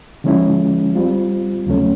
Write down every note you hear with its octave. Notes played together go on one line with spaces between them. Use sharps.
D3 F3 G#3 C#4 E4
G3 C4 F4
D#2 C#3 F#3 A3 C#4